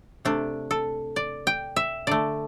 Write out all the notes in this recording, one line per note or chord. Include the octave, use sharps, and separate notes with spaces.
C3 A3 D4
A4
D5
G5
E5
D3 A3 D5